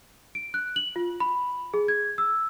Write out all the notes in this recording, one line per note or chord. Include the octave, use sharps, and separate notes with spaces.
D7
F#6
F#7
F4
B5
G#4
G#6
E6